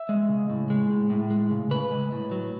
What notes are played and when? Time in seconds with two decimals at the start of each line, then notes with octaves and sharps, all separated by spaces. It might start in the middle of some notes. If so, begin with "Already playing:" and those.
Already playing: E5
0.09 G#3
0.29 C#3
0.50 A2
0.70 G#3
0.90 A2
1.10 A2
1.30 G#3
1.51 C#3
1.71 C#3 B4
1.91 G#3
2.12 A2
2.31 F#3